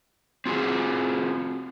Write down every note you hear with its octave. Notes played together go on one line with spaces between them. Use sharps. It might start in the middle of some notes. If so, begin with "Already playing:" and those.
C4 F4 F#4 G#4